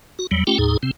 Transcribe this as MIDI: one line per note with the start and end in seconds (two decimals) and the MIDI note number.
0.19 0.27 66
0.31 0.44 40
0.31 0.44 54
0.31 0.44 55
0.47 0.58 57
0.47 0.58 61
0.47 0.58 65
0.47 0.58 67
0.47 0.58 79
0.58 0.77 39
0.58 0.77 45
0.58 0.77 63
0.58 0.77 68
0.83 0.91 48
0.83 0.91 60